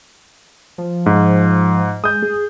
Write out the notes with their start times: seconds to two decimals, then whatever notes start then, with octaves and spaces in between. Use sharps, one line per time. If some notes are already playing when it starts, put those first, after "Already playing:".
0.78 F3
1.06 G#2
2.04 G#3 D#6 G6
2.23 G#4